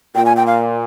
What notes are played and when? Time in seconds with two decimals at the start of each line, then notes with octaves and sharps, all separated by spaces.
0.15 A#2 G5
0.26 G#5
0.36 G5
0.47 F5